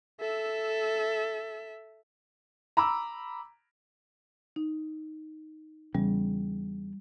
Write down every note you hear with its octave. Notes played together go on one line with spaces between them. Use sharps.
A4 E5
A#5 B5 D6 E6
D#4
E2 C#3 G3